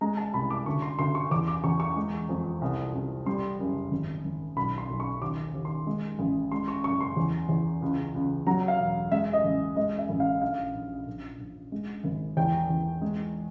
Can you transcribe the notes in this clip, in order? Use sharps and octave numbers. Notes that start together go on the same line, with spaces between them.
G#3 A#5
A5
C2 B5
D6
D2 C#6
C6
D2 C6
C#6
E2 D6
D6
E2 C#6
C#6
G#3
F2
C2
C2
G3 C6
F#1
G#1
G#1
B1 B5
C6
B1
C#6
D#2 D6
D#2
C6
G#3
A1
G#3 C6
C#6
F#1 C#6
C6
E2
E2
C#2
C#2
F#3 A#5
F5
E1
G#3 E5
D#5
A1
G#3 D#5
E5
A1
F5
A#1 F5
A#1
A#1
A#1
G#3
G#1
E2 G5
E2
G#3